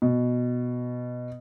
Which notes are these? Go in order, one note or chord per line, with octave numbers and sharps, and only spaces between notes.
B2